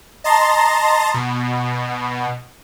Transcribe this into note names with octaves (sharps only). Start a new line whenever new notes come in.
D#5 A5 A#5 C6 A6 A#6
B2